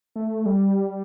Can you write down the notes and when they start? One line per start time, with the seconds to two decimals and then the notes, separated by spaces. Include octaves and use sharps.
0.16 A3
0.46 G3